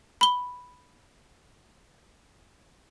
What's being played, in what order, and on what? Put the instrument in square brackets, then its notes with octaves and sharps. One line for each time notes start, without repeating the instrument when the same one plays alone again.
[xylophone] B5 G7